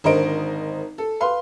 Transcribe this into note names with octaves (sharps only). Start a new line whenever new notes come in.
G#1 D3 A#4 C5 D#5 D7
A4
B4 F5 C6